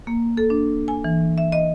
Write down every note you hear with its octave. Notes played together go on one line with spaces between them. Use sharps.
A#3
A4
D4
G#5
E3
E5
D#5